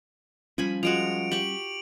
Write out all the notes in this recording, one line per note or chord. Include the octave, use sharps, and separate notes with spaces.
F3 G3 A3 C#4 G#5 B5
F3 G#3 F#4 C#7 D7 F7
G4 C#6 D7 F#7